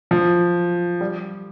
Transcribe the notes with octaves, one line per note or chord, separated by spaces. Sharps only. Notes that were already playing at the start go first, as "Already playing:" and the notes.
F3
G3